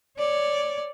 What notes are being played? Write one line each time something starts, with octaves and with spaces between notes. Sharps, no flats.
C#5 D5